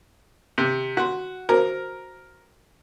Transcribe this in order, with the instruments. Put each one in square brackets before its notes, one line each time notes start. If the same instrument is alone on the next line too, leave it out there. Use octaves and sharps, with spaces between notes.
[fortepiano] C3
[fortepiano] F#4 [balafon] F#5 C6
[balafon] F#4 C5 [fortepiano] A#4